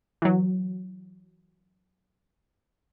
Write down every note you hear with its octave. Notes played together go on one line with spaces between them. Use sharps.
E3 F#3